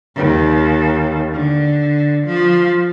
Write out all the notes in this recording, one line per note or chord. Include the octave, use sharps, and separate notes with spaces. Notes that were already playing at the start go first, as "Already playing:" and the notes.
D#2
D3
F3